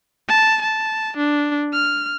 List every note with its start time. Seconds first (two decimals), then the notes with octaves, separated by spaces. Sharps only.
0.28 A5
0.62 A5
1.17 D4
1.73 F6